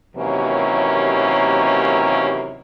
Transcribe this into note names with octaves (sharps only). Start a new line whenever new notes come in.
D#2 C3 E3 F#3 A#3 C#4